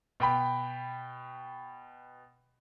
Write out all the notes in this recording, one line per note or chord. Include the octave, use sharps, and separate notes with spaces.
B2 G5 B5